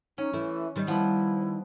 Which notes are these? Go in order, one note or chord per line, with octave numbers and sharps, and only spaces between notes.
C#4 D#4
E3 A3 E4
D#3 G3 B4
F3 B3 E4